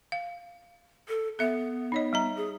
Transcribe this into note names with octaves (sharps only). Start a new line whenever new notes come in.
F5
A4
B3 A4 E5
D#4 C#5 D#5
G3 D#5 A#5
G#4